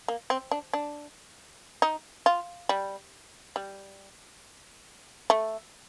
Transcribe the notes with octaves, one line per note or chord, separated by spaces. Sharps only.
A#3
C4
D4
D4
D#4
F4
G3
G3
A3